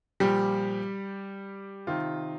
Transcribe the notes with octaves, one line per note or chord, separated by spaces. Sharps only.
A#2 F3 G3 G4
C3 D#3 F4